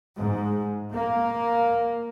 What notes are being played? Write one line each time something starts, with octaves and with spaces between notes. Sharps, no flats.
G#2
A#3